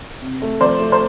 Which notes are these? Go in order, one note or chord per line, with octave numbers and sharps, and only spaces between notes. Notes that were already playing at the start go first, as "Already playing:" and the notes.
C3
A3
F3 C5 D5
A3
C5